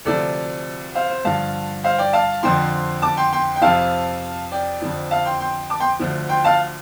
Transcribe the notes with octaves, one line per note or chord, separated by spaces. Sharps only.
D2 C3 F3 A4 D5
C5 F5
C5
G2 D3 F3 F5 A5
C5 F5
D5 G5
F5 A5
F2 D3 F3 G5 C6
A5 D6
G5 C6
G5 C6
G5
F2 C3 F3 F5 A5
D5 G5
F2 D3 F3
F5 A5
G5 C6
G5 C6
A5 D6
G5 C6
D2 D3 F3
G5 C6
F5 A5